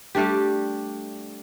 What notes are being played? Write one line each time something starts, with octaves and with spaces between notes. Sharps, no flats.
G3 A3 D4 G4